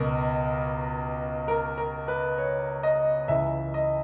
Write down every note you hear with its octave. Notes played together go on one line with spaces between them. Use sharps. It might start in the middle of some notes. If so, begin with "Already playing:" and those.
Already playing: C#2 B2 A#4
A#4
A#4
B4
C#5
D#5
C#2 C#3 E3 E5
D#5